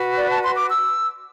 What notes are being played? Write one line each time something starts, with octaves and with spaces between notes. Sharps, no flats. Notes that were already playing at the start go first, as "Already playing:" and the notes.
Already playing: F#4 B4
D5
A5
C6
D6
E6